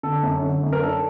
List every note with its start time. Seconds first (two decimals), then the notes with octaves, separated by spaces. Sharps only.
0.03 D3 A4
0.23 F#2
0.43 D3
0.63 F#2
0.73 A#4
0.83 D4 A4